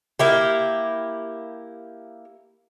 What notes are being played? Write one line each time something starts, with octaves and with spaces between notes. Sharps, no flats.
A#3 E4 G4